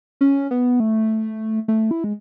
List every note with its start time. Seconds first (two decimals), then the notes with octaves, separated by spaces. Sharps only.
0.21 C#4
0.51 B3
0.80 A3
1.68 A3
1.91 E4
2.04 G#3